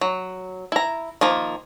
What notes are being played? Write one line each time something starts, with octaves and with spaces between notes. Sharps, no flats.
F#3
E4 A#5
D#3 F3 A#3